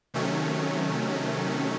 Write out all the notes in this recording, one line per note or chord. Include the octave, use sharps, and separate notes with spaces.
C3 D#3 F#3 A3 C#4